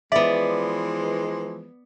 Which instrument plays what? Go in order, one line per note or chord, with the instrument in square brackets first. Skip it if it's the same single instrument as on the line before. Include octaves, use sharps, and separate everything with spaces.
[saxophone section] E3 F3 G#3 [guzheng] B3 D5 [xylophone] E5